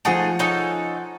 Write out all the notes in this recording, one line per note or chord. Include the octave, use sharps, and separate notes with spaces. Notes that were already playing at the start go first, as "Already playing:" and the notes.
F3 A3 D#4 G#4 F#5 A5
C#4 D#4 A4